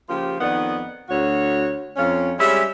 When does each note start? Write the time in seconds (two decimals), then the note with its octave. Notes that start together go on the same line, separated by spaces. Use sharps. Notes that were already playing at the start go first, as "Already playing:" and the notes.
0.09 C#3 F3 A#3 F4 G4
0.40 F2 D#3 B3 D#4 D5 F#5
1.09 D2 F#4 C#5
1.97 F2 C#4 F4
2.39 G3 G#3 C#4 E5